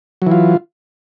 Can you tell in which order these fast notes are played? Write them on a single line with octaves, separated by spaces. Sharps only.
F#3 E3 F4